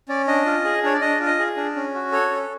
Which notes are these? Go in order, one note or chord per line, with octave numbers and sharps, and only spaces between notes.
C#4 D5
D4 D#5
F4
G#4
D4 C#5
D5
D4 D#5
F4
D#5
G#4
D4
C#4
F#4
A4 C#5
C#4